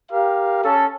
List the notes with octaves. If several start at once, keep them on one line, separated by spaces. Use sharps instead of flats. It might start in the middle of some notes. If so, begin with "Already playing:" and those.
G4 A#4 F5
C#4 A4